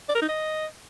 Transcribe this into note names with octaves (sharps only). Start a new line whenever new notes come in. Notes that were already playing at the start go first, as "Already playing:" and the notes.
D5
A#4
D#4
D#5